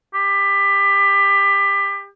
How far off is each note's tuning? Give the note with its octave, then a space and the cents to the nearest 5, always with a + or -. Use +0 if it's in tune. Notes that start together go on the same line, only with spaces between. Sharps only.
G4 +25